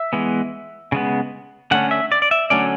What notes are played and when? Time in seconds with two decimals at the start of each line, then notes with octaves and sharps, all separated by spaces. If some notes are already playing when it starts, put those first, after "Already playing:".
Already playing: E5
0.13 E3 G#3 B3
0.92 C#3 G#3 B3
1.71 D3 A3 C#4 F#5
1.91 E5
2.12 D5
2.22 D5
2.31 E5
2.50 D3 F#3 A3 C#4 D5